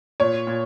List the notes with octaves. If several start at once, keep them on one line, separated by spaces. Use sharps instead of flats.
A#2 C#5
A#2